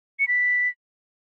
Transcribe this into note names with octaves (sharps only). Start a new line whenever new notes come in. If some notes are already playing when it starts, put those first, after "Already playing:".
C#7
B6